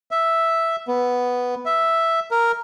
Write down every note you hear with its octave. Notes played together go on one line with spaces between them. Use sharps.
E5
B3
E5
A#4